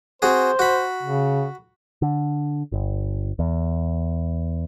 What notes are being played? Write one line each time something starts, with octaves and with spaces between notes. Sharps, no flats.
C4 F#4 G#4 C5
F#4 B5
C#3
D3
G1
E2